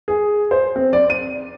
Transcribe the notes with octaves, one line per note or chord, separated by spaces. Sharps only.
G#4
C5
C4
D5
D#7